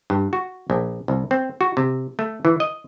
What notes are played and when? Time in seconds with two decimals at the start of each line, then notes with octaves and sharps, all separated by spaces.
0.10 G2
0.33 F#4
0.70 A#1
1.08 C2
1.31 C4
1.61 F#4
1.77 C3
2.19 A3
2.45 E3
2.60 D#5